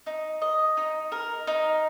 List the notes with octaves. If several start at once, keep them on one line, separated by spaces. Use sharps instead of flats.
D#4
D#5
D#4
A#4
D#4